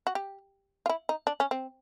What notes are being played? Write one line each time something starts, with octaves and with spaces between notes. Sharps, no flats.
F#4
G4
F4
E4
D#4
D4
C#4
C4